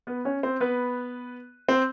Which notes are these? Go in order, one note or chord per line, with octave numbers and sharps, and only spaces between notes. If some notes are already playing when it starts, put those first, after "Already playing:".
B3 B4
C#4 C#5
C4 C5
B3 B4
C4 C5